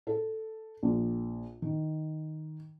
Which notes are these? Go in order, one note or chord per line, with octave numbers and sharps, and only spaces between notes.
A4
A#1
D#3